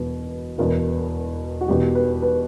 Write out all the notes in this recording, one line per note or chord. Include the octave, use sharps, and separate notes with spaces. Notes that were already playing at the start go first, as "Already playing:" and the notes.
Already playing: E1 E2 B2 B4
E1 E2 B2 A#4
F#4
E1 E2 B2 G4
B4
B4